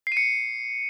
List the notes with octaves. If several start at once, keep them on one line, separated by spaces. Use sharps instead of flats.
C7
D#7
C#7